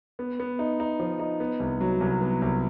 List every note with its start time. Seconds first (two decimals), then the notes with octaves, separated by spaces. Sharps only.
0.19 B3
0.39 B3
0.59 D#4
0.80 D#4
1.00 F3
1.19 D#4
1.40 B3
1.60 C2
1.81 F#3
2.00 C2
2.21 B3
2.42 C2